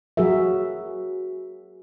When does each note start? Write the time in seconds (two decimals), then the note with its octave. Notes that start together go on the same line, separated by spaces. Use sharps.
0.17 F#3 F#4 G#4 A#4 E5